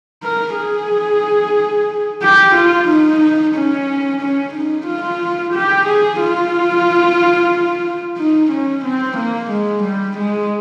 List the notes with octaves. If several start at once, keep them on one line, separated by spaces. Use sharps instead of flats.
A#4
G#4
G4
F4
D#4
C#4
C#4
D#4
F4
G4
G#4
F4
D#4
C#4
C4
A#3
G#3
G3
G#3